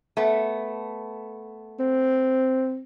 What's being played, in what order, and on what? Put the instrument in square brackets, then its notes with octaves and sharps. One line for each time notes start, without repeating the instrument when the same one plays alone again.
[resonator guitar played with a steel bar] A3 B3
[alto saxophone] C4